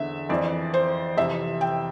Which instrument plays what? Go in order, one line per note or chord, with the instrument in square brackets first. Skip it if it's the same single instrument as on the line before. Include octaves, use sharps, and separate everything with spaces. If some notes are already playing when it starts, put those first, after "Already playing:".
Already playing: [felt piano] E2 D3 E5
F2 E3 D5
C5
F2 C3 E3 E5
G5